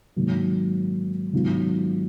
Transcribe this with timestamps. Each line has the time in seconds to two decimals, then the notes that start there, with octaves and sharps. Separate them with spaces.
0.16 G#2 D#3 F#3 A#3
1.33 G#2 D#3 F#3 B3 F4